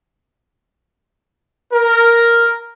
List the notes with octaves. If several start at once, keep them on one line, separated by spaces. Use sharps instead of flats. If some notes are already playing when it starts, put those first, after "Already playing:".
A#4